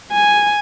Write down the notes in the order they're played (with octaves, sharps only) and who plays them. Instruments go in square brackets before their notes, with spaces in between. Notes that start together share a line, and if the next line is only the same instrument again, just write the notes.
[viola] G#5